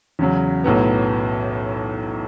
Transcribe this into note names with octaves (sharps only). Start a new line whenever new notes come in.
E2 C#3 F#3
B1 A2 F#3 B3